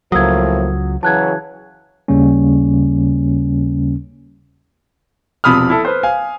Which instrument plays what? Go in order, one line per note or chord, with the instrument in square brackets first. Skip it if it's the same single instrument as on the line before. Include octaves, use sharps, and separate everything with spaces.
[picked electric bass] C#2 F#3 [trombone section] A2 F3 A#3 [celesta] D#6 E6 G#6
[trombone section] C#3 E3 F#3 [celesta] A5 F#6 G#6
[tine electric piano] D#2 C#3 G3 A#3 C#4
[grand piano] E1 C3 F3 B5 D#6 F6
E4 A4
B4 C5
F5 G#5